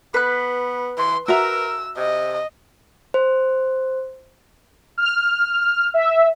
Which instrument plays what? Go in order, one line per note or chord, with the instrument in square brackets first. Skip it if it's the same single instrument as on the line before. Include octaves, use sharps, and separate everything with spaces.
[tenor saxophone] B3 [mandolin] B4 F#6
[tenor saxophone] E3 [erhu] C6
[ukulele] F#4 E5 A#5 [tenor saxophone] A#4 [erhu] E6
[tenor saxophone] C3 [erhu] D#5
[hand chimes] C5
[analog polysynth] F6
E5